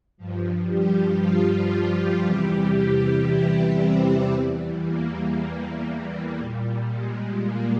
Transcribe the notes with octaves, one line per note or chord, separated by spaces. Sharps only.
G2 F3
G3 G4
F3 F4
F3 F4
E2 C3 E3 G3 G4
G3 G4
E3 E4
C3 C4
E2 E3 G3
A#3
A#3
A#2 G3
G#3
A#3